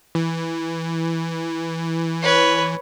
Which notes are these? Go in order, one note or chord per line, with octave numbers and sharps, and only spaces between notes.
E3
B4 C#5